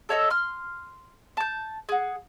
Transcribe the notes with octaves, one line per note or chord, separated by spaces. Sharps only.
A4 C#5 D#5 E5
C6 F6
A5 G6
G#4 F#5